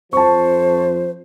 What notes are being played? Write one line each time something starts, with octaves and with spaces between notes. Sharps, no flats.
F2 F3 C5 A5 C#6